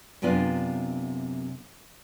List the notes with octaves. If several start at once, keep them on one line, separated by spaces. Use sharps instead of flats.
F#2 C3 B3 D4 F4